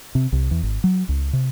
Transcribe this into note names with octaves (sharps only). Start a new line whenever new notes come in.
C3
C2
E2
G#1
F#3
C#2
C3